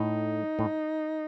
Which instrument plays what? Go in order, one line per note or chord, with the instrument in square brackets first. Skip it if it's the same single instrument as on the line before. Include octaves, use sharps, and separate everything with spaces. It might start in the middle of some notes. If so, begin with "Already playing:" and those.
Already playing: [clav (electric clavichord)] A2 [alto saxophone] D#4
[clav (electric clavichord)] A2